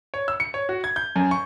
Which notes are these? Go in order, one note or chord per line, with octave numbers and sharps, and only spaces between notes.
C#5
E6
C#7
C#5
F#4
G#6
G6
F#2
C#6